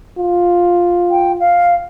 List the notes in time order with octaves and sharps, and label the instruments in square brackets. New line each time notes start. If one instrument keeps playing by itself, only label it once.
[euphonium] F4
[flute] G5
F5